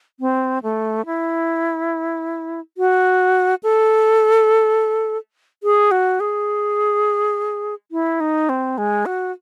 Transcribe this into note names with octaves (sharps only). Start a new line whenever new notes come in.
C4
A3
E4
F#4
A4
G#4
F#4
G#4
E4
D#4
C4
G#3
F#4